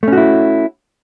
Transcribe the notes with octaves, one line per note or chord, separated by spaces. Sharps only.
A3 C#4 E4 F#4